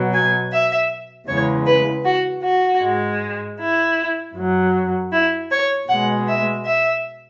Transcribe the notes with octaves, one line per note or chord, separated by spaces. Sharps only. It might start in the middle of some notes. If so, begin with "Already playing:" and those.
Already playing: B2 F#3
G#5
E5
E2 C#3 G#3 C#5
B4
F#4
F#4
G#2 G#3
E4
F#2 F#3
E4
C#5
B2 G#3 F#5
E5
E5